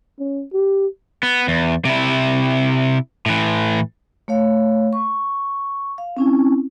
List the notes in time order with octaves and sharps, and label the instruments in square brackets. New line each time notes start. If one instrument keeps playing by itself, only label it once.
[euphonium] C#4
G4
[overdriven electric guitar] B3
E2
C3 E4
A2 E3
[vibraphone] A3 C#5 F5
C#6
F5
C4 C#4 E4